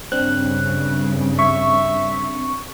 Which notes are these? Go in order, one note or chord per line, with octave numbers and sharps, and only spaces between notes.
G2 C#3 C4 D4 F#6
E5 C#6